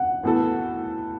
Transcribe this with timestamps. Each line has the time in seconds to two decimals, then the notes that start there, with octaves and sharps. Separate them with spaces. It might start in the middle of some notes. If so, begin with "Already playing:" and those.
Already playing: F#5
0.23 A2 E3 B3 F#4 A4